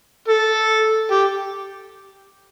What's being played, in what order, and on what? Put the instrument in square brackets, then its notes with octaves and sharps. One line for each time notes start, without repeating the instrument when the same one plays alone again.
[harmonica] A4
G4